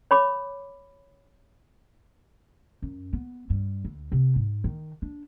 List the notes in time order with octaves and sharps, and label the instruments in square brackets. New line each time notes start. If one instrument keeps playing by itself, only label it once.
[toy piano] C#5 B5 D6
[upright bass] F#2
B3
G2
D2
C3
G#2
D#3
D4